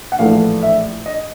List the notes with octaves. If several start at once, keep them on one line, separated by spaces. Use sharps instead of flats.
F#5
A#1 A2 E3 A3 F5
E5
D#5